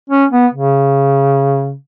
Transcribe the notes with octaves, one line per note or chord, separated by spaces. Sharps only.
C#4
B3
C#3